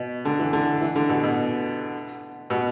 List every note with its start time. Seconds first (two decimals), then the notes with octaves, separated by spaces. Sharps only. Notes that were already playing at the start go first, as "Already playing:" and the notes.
Already playing: B2
0.25 D3
0.39 E3
0.53 D3
0.81 E3
0.96 D3
1.09 B2
1.23 B2
2.50 B2